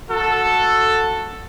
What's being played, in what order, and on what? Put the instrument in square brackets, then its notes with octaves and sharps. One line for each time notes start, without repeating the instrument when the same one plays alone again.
[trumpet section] F#4 A4